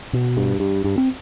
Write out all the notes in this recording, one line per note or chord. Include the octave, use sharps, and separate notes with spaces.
B2
G2
G2
G2
C4